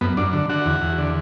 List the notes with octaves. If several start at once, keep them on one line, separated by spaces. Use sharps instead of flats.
F#2 B3
F#2 D4
D3
D3 F#4
E2
E2
D3